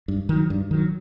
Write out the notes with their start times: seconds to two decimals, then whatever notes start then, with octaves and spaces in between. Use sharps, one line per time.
0.08 G2
0.29 D#3 F#3
0.50 G2
0.71 D#3 F#3